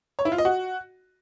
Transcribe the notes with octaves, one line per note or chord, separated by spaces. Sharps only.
C#5
E4
F4
D#5
F#4